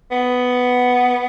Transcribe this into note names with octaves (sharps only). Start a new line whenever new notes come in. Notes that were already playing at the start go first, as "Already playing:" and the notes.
B3